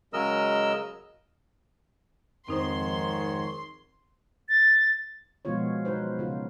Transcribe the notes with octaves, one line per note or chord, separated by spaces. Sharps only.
C#3 F#3 G#3 A#4 D#5 E6
F2 G#2 D#3 C4 D#4 C5 C#5 C6
A6
B2 F3 G#3 B3 F4 C#5
F#3 D#4 B4 C5
C#3 F4